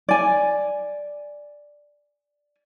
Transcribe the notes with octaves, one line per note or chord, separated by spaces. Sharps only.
D5 G#5